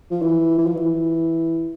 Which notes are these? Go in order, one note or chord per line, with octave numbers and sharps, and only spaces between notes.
F3
E3
E3
F3
E3